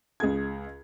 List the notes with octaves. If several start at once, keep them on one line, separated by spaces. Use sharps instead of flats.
C#2 G#4 G#6